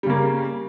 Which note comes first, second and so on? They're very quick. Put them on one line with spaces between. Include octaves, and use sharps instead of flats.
G3 C#3 A#3